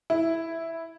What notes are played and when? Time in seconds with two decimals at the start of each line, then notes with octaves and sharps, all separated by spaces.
0.10 E4